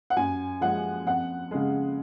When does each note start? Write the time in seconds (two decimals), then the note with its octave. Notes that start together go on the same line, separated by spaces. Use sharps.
0.10 F#5
0.16 F#2 G#5
0.61 F3 G#3 F#5
1.06 F2 F#5
1.51 C#3 G#3